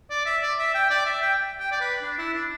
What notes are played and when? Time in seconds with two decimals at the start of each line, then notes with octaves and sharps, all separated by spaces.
0.10 D5
0.26 E5
0.42 D5
0.59 E5
0.74 G5
0.90 D5
1.06 E5
1.22 G5
1.60 G5
1.72 D5
1.81 B4
2.02 D4
2.18 E4
2.34 D4